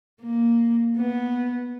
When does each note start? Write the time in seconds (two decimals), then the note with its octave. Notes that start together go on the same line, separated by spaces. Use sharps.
0.21 A#3
0.97 B3